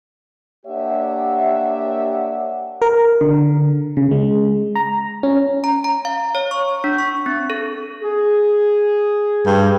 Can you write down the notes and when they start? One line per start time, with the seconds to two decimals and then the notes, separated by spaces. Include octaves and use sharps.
0.66 A#3 D4 G4 C#5 E5 F#5
2.82 A#4
3.21 D3
3.97 C#3
4.11 G#3
4.76 A#5
5.23 C#4
5.64 A#5
5.84 A#5
6.05 F5
6.35 C#5
6.51 C#6
6.84 D4
6.98 C#6
7.26 C4
7.50 A4
8.01 G#4
9.46 G2